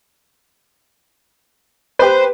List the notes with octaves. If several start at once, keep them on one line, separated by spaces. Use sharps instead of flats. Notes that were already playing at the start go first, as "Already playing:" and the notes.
G4 B4 C5